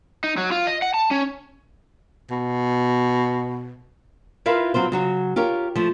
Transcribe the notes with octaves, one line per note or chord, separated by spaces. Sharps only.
D#4
F#3
F4
D#5
F#5
A5
C#4
B2
E4 F4 A#4 B4 E5 F5
F#3 C4 F4 C5
C#3 F#3 F#4
F4 G4 A#4 C#5
F3 A3